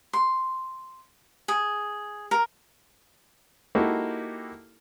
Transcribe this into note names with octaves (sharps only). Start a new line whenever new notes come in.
C6
G#4
A#4
A#3 D#4 E4 F#4 G4 A4